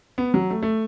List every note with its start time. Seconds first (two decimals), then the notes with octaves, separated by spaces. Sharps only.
0.18 B3
0.34 F#3
0.50 A3
0.63 A3